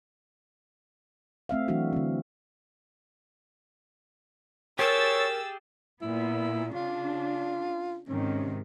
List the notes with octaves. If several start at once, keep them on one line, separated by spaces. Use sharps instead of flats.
A3 C4 E5 F5
E3 F#3 A3 D4 F#4
D3 C4
G4 G#4 A#4 C#5 G5 E6 A6
A#2 B3 E4
C#3 D4 F4
G#2 C3 D#3 C#4